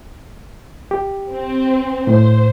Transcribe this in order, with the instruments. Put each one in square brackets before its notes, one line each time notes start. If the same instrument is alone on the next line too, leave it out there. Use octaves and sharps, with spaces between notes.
[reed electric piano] G4
[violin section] C4
[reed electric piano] A2 [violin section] C5